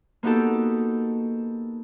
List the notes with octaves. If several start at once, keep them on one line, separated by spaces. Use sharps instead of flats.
A#3 B3 D#4 F#4 G4 A4